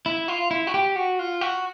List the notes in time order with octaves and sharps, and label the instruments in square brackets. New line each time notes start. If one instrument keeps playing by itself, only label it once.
[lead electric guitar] E4
F4
E4
F#4
G4
F#4
F4
F#4